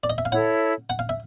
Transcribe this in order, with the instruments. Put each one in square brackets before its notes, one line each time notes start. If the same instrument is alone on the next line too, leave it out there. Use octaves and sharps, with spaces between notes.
[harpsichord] D5
D#5
E5
F5
[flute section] E4 A4 C#5 [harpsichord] F#5
[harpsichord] F#5
F5
E5